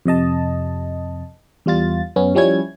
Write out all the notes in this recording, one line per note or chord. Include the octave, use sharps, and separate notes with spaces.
F2 C3 D#5 A5
E2 G3 F4 A6
F#2 B3 C#4
F3 G3 C#4 E4 C#5 G#6